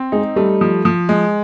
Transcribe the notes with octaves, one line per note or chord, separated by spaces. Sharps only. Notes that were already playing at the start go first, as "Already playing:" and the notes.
Already playing: C4
G#3 D#4
G3 A3
F3
F3
G#3